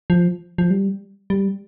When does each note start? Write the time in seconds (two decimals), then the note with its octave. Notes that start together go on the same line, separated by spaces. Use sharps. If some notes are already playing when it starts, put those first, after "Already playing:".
0.10 F3
0.58 F3
0.70 G3
1.30 G3